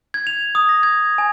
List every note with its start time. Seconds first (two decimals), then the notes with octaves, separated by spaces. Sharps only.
0.14 G#6
0.27 F7
0.55 D#6
0.69 A#6
0.83 G#6
1.18 G#5